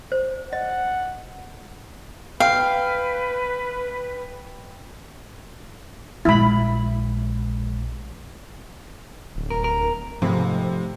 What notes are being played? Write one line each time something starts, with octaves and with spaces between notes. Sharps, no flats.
C5
D#5 F#5
B4 F5 G5
A#1 G#3 E4 B5
D1
A#4
A#4
G#2 C3 F3 A3 B5